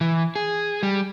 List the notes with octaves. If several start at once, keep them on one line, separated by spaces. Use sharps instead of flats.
E3
G#4
G3